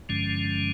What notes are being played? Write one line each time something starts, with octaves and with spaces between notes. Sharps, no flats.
G2 D3 F3 G#3 C#4